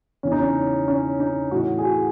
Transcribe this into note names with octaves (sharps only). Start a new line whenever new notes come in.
E2 C#3 E3 C#4
D#4
C#4
C#4
D#4
A2 E3 F#4
G#4
F#4